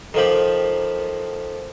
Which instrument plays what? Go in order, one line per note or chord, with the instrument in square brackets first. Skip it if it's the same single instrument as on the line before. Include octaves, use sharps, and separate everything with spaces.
[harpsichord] D#3 F3 G4 [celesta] A4 F#7 [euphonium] A#4